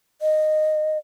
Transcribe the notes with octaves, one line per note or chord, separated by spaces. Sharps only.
D#5